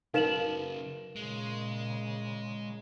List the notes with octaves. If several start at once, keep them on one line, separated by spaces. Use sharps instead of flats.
C#3 F#3 D#4 A#4 B4 F5 E7 F#7
A#2 C#3 G#3